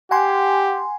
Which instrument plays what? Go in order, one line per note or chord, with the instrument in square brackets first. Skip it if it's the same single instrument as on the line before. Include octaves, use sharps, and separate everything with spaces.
[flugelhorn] G4 [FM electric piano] F#5 G#5 C6